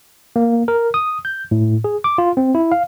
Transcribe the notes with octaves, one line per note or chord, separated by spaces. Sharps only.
A#3
A#4
D#6
G6
A2
G#4
D6
F4
C4
E4
F5